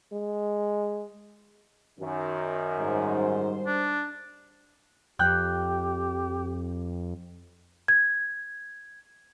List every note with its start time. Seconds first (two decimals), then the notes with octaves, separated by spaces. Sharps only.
0.12 G#3
1.99 F#2 D#3
2.79 G#2 G3 C5
3.67 D4
5.19 F2 G4 G5 F#6 G6
7.88 G#6